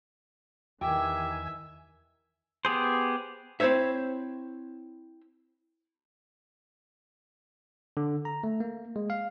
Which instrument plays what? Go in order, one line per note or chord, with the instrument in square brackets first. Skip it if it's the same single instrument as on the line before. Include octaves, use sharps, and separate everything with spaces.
[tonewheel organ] E2 G#5 [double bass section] D#3 E3 [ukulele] G4 [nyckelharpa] E5
[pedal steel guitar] B3 G4 G#4 C5
[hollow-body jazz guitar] C4 E4 C5 C#5 E5
[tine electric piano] D3
A#5
A3
A#3
G#3
F5